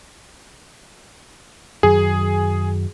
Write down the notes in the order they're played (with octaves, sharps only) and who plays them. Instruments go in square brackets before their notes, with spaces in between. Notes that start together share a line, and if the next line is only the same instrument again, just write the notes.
[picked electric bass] F#2 D#3 F#3 [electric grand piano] G#4